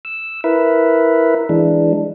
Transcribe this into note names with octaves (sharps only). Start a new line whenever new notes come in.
E6
E4 A#4 B4 E5
E3 G#3 D4